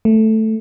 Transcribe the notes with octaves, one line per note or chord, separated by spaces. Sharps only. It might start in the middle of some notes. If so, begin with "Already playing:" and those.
A3